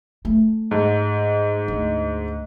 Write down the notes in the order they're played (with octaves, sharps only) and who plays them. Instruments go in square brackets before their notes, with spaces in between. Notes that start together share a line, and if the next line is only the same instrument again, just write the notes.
[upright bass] A3
[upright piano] G#2
[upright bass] D2